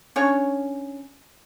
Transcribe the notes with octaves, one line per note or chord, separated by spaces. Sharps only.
C#4 D4 C#5